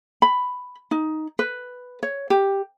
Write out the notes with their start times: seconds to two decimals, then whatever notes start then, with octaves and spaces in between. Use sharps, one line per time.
0.22 B5
0.91 D#4
1.39 B4
2.03 C#5
2.30 G4